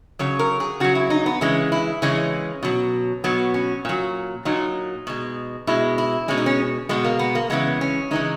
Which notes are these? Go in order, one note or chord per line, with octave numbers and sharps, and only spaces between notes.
C#3 F#3 C#5
A#4
G#4
C#3 F#3 F#4
E4
D#4
B3
C#3 E3 G#3 C#4
E4
C#3 E3 G#3 C#4
B2 F#3
B2 F#3 B3
C#4
A#2 F#3
A#2 F#3 D#4
B2 G#3
B2 G#3 E4
E4
B2 G#3 C#4
D#4
C#4
B2 G#3 B3
A#3
B3
A#3
C#3 E3 G#3 B3
C#4
C#3 E3 G#3 D#4